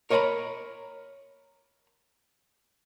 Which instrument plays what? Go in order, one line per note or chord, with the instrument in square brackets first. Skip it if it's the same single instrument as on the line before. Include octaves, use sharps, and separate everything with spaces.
[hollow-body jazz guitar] A#4 C#5 D#5 G#5 A#5 B5